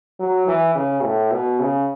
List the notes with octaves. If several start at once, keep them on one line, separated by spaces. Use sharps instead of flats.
F#3
E3
C#3
A2
B2
C#3